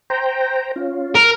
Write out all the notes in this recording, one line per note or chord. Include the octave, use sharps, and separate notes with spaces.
C5 G5 A#5
C#4 F4
A#4